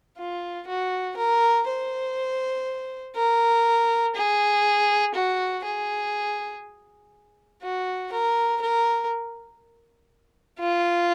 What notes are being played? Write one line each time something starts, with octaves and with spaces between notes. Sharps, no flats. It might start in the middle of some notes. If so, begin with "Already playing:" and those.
F4
F#4
A#4
C5
A#4
G#4
F#4
G#4
F#4
A#4
A#4
F4